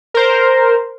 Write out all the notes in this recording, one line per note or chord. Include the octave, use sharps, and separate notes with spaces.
A#4 C5